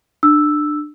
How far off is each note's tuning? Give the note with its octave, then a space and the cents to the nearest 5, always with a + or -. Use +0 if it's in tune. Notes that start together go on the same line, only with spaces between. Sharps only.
D4 +25 E6 +0